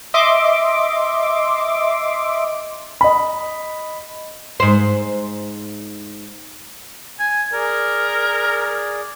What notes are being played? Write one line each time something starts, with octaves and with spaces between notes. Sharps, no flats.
D#5 E5 C6 D6
D#5 B5
G#2 C5
G#5
G#4 A#4 D5